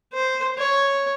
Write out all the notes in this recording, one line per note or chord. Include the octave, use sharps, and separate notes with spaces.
C5
C#5